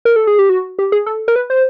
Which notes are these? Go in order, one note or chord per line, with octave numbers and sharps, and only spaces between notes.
A#4
A4
G#4
G4
F#4
G4
G#4
A4
A#4
B4
C5